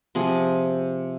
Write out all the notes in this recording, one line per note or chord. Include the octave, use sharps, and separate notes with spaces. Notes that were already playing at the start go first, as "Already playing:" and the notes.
C3 F3 G#4